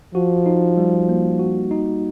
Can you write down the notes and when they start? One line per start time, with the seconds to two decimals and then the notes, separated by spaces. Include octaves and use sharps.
0.14 F3 F#4
0.46 D#4
0.77 G3
1.09 A#3
1.39 F#4
1.71 D#4